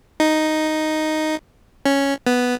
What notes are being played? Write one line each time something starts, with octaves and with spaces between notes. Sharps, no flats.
D#4
C#4
B3